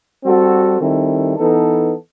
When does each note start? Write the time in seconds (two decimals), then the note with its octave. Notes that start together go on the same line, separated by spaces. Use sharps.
0.24 G3 C4 F#4 A4
0.80 D#3 G3 C4 E4 A4
1.36 E3 B3 D#4 A4